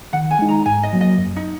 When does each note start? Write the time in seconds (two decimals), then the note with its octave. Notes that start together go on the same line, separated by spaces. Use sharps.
0.13 D#3 F#5
0.31 G#5
0.39 G#3 D#4
0.49 A#5
0.66 G#2 G#5
0.83 D#5
0.93 F#3 A#3
1.01 D#5
1.18 F#2
1.36 D#4